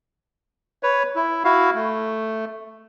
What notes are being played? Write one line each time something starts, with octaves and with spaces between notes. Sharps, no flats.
B4 C#5
E4
E4 F#4 F5
A3